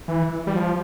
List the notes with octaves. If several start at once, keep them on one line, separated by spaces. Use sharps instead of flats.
E3
G3
F3